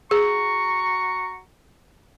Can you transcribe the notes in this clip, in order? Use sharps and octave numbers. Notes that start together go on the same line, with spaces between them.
F#4 G#4 A#5 C#6